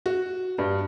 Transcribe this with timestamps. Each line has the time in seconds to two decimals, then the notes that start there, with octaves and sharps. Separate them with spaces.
0.06 F#4
0.58 G2